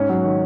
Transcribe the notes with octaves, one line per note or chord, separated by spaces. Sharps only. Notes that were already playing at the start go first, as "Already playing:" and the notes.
Already playing: G#2 C#4
F#3
D#3